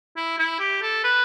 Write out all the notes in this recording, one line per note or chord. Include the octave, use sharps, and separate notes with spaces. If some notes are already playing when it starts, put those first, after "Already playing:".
E4
E4
G4
A4
B4